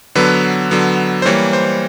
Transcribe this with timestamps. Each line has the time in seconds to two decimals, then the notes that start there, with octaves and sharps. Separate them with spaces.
0.15 D3 F#3 B3 B4
0.71 D3 F#3 B3
1.22 C5
1.26 E3 G3 A#3 C#5
1.53 C5